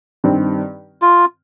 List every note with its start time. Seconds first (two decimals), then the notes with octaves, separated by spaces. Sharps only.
0.24 G2 D#3 G3 C4
1.02 F4